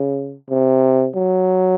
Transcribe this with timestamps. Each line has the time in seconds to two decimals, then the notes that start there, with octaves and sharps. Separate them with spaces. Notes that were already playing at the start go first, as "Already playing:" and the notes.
Already playing: C#3
0.50 C3
1.15 F#3